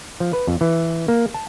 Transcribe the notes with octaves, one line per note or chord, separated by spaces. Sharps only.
F3
B4
F2
E3
A#3
A5